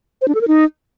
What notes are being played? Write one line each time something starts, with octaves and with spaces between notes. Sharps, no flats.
C5
D4
A4
A#4
D#4